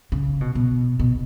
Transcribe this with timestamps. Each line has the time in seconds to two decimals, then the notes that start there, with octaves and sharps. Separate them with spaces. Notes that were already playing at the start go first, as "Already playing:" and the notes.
0.12 C#3
0.41 B2
0.55 B2
0.99 B2